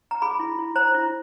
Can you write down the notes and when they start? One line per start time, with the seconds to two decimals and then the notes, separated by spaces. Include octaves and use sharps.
0.11 A#5
0.22 G#4 B5
0.40 E4
0.59 E4
0.76 C5 A#5
0.94 E4